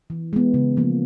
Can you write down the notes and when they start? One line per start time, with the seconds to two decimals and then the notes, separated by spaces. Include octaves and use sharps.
0.10 E3
0.33 G#3 B3
0.54 C#3
0.77 F3 A#3